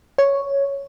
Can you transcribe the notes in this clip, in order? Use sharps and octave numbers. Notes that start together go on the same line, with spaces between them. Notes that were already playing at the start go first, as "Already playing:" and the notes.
C#5